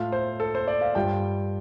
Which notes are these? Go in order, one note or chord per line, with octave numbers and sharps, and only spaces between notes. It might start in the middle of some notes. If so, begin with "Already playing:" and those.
Already playing: A2 A3 F4 F5
C5
A4
C5
D5
F5
G2 G3 F4 G5